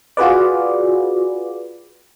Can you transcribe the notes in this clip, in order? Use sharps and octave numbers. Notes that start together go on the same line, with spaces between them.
F4 F#4 G#4 B4 D5